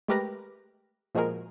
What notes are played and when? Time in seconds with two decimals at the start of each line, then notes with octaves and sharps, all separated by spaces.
0.08 G#3 A3 G4 A#4 B4 A#6
1.15 A#2 F3 G#3 F#4 G#4 A#4